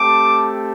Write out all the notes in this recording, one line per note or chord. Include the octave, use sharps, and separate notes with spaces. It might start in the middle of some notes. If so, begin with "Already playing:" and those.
Already playing: A3 C4 G4 A5 D6